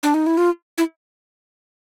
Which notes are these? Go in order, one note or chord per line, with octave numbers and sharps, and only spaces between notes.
D4
D#4
E4
F4
E4